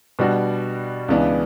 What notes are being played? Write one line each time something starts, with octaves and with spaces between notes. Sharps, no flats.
B2 G3 D4 F#4
C#2 C#3 E3 B3 D4